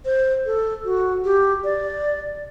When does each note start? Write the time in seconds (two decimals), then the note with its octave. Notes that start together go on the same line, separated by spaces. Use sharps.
0.05 C5
0.46 A4
0.85 F#4
1.24 G4
1.64 D5